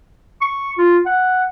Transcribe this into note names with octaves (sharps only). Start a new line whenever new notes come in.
C#6
F4
F#5